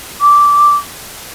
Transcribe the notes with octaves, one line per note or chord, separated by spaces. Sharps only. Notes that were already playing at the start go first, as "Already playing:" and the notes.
D6